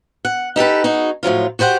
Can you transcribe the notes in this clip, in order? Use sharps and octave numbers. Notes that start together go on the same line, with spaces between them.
F#5
D#4 G4 A4 B4
D#4 F#4 G#4
A2 F3 F#3 F4
F#4 G4 C5 D5 F#5